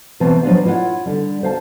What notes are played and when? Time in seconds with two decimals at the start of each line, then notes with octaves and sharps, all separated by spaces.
0.20 B2 E3 C4 A5
0.43 F3 F#3 A3 D4 B4 F5
0.65 E4 F4 C#5 D#5 F#5
1.06 D3 G3
1.43 C5 F5 A5